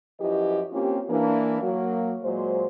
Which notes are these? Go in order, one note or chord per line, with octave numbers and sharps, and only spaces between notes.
F#2 F3 E4 G4 B4 D#5
A#3 C4 C#4 F4 G4
E3 A#3 D4
F#3 A#3 F#4
A#2 F#3 G#3 C5